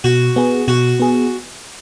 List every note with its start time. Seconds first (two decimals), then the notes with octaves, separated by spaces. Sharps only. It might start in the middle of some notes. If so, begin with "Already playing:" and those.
0.04 B2 F#4
0.36 B3 G#4
0.68 B2 F#4
1.00 B3 G#4